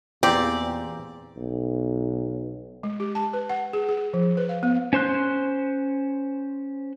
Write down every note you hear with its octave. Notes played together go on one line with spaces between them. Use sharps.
E2 A#2 C4 G4 D5
B1
G#3
G4
A5
B4
F#5
G#4
G#4
F3
B4
F5
B3
C#4 C5 C6 F#6